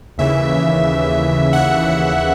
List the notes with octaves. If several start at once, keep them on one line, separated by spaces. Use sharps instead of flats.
D#2 C#3 E3 E5
F#5